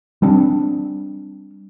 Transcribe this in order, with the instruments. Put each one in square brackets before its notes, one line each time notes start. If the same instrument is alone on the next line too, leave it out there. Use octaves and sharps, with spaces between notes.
[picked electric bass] G3 C4 D4